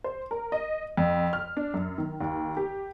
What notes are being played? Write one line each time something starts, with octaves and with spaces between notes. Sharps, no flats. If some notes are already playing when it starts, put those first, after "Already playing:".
C5
A#4
D#5
F2
F6
D4
F#2
D#3
D#2
G4